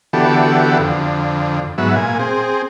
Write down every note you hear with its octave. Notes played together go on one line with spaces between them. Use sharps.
D3 E3 B3 F#4 G4 A4
F2 D3
G#2 F#3 B3 E5
A#2 G#5
C4 G#4